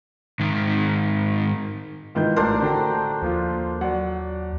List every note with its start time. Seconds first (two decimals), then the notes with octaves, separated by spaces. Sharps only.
0.40 G#2 D#3
2.15 G#2 D#3 E3 F4 G6
2.36 A1 D4 A#4 C5
2.62 D3 F#4 G5 A#5
3.22 D#2 F3 A#3 F4
3.81 F#3 D5 F#5